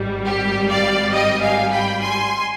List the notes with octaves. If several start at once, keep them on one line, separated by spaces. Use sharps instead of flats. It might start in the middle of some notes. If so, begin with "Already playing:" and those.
Already playing: G#1 G#2 G3
G4
D5 F5
D#5 G5
F5 G#5
G5 B5
G#5 C6